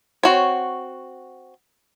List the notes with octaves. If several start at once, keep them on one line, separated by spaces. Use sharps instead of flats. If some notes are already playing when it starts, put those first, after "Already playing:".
C4 F#4 C#5